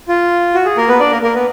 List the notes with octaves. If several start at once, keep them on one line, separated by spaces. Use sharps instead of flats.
F4
F#4
G#4
A#3 A#4
B3 B4
D4 D5
A#3 A#4
A#3 A#4
B3 B4